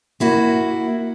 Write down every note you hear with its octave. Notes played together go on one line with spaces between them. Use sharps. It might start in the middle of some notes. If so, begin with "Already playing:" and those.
A#3 E4 F#4